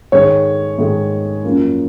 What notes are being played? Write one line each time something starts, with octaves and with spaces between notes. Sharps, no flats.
G#2 D#3 G#3 C#5
G#2 D#3 G#3
F#2 F3 A#3